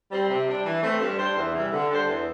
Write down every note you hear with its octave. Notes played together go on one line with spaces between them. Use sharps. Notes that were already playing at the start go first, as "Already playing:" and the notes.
G3 C4
C3
G3 D4
E3
A3 C4
G2
G3 D4 C5
E2
C3 E3 G3 E4
D3
G3 D4 A4 C5
E2